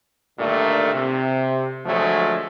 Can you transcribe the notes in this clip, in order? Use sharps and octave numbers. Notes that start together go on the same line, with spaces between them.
G2 A#2 D3 D#3 A3
C3
D2 F3 F#3 G#3 A3